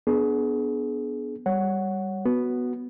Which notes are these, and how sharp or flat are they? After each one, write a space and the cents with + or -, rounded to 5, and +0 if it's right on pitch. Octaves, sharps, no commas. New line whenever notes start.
B3 +0 D4 +0 G#4 +30
G3 +0 C#5 +0 F#5 +0
B3 +0 F#4 +0